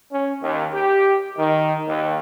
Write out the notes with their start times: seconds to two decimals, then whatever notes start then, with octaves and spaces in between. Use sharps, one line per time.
0.11 C#4
0.42 D#2
0.74 G4
1.37 D#3
1.88 D#2